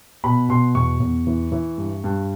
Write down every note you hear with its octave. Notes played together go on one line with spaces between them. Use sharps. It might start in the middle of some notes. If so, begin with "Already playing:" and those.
B2 B5
B2 C6
E2 C#6
E2
E3
E3
G2
G2